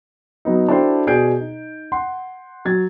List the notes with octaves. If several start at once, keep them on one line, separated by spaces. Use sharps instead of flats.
F#3 B3 D#4
D4 E4 F#4 A4 C5 G5
B2 G#4 D5 G6 D7
D#4
F#5 C6
F#3 G#6 A6